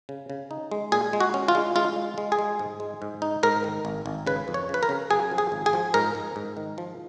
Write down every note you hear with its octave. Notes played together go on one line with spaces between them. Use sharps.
C#3
C#3
D#4
G#3
A#2 G#4
G#3
F#4
C#4
F4
G#3
G#3 F4
G#3
G#3
G#4
G#3
G#2
G#3
G#2
D#4
G#2 A#4
D#3
G#1
G#1
C#3 B4
F2
C#5
C#3
B4
A#4
C#3
F#2 G#4
F3
G#4
G#1
G#4
F3
G#2 A#4
G#2
G#2
D#3
F3